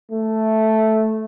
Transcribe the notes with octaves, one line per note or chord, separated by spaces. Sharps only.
A3